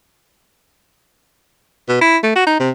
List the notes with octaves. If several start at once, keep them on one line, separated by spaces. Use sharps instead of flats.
B2
E4
A3
F#4
D#4
C3